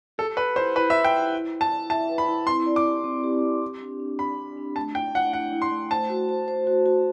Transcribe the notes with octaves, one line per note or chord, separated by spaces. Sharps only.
G4 A4
B4 F#5
E4 C5
E4 B4
E5
F#5
G5
E4
E4
E4
A5
E4
E5 A5
B4
B5
E4
C4 C6
D5
D6
G4
C4
G4
C4
G4
D4
D4
D4 B5
D4
D4
A3 A5
E4 G5
E4 F#5
E4 F#5
E4
C6
A3
C5 A5
F#4
C5
C5
F#4
F#4